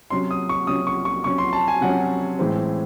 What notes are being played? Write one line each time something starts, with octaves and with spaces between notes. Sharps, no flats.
C3 F#3 C#4 C6
D#6
C#6
C3 F#3 C#4 D#6
C#6
C#6
C3 F#3 C#4 C#6
C6
A5
G#5
C3 F#3 C#4 F#5
A2 E3 G#3 C4